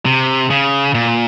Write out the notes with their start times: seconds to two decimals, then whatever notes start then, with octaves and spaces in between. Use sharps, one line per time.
0.05 C3
0.50 C#3
0.95 A#2